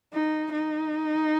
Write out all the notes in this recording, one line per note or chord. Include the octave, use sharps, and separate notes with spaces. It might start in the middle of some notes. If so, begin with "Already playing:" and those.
D#4
D#4